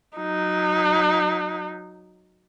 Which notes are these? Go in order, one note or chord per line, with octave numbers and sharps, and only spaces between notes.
F#3 D#4